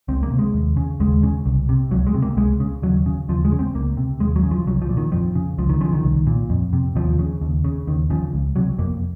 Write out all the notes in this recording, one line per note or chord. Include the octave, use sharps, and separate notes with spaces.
C#2 C4
A#3
C3
G#3
D#2
C#3
D#2 G#3
C#3
C2
C3
C#2 F#3
G#3
C3
A#3
C#2 G#3
C#3
D#2 F#3
C#3
D#2 F3
G#3
C#3
C4
C#2 A#3
C3
D#2 G#3
F#3
C#3
F3
C2 F#3
F3
A#2
D#3
F2 F3
C#3
C#2 F3
D#3
C#3 F3
D#3
C2
A#2
F2
C3
D#2 F3
C#3
D#2
C#3
D#2 D#3
C#3 F3
C#2
C3 F#3
F2 A#3